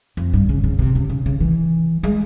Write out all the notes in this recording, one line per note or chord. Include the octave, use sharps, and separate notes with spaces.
F2
G2
C#3
C#3
C3
C#3
C#3
C#3
E3
G#3